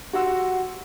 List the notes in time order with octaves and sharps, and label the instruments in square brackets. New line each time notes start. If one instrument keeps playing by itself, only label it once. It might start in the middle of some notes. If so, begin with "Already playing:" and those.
[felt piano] F#4 G4 F#5 C6 E6